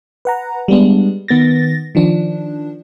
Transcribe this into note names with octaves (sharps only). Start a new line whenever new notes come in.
B4 F#5 A#5
G3 G#3 B3 D4
D#3 B3 A6 A#6
D#3 F3 D4